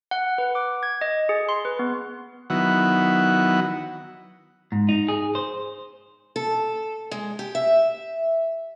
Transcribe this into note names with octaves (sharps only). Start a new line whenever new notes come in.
F#5
B4
D6
G#6
D#5
G#4
C6
B4
B3
D#3 F#3 B3 E4 F#5
G#2
D#4
G#4
C5
A4
G#3
G4
E5